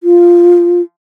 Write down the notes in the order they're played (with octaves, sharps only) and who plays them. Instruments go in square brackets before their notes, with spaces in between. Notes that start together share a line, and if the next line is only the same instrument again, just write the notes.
[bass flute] F4